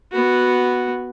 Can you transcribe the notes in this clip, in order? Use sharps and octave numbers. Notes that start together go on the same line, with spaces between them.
B3 F#4